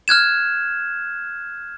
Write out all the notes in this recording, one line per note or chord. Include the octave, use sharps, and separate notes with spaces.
F6 F#6 G#6 E7